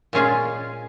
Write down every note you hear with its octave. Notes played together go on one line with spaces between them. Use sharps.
A#2 G#3 C#4 F4 G#4